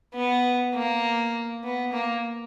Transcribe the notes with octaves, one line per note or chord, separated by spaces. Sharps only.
B3
A#3
B3
A#3